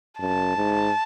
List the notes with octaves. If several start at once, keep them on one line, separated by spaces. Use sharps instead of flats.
F#2 A5
G#2